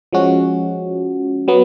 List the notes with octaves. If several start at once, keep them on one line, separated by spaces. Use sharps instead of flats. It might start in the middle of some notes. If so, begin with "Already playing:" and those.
F3 G#3 C#4 F#4
F#3 B3